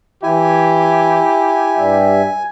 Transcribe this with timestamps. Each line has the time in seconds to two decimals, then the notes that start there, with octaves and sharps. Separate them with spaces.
0.23 E3 E4 G4 G#5
1.76 G2 G3 E5